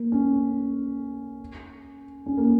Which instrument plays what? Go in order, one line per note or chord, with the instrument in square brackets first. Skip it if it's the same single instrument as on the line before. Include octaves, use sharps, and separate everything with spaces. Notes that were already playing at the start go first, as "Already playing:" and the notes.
Already playing: [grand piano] A#3
C#4
C#4
A#3